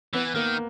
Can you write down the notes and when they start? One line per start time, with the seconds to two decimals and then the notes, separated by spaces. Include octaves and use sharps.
0.13 E3 B3
0.35 D#3 A#3